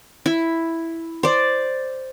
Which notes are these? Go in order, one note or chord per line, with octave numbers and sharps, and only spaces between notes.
E4
C5 D5